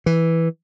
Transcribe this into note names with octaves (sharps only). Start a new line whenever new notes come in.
E3